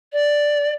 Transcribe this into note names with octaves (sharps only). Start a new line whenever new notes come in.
D5